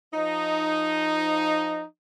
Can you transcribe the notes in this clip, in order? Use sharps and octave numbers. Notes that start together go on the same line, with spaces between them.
F3 D#4